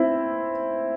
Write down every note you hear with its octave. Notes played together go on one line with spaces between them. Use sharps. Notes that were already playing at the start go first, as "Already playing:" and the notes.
Already playing: C4 E4